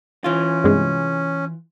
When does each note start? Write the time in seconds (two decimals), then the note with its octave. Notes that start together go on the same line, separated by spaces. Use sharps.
0.24 E3 C#4 F4
0.64 G2 C3 G#3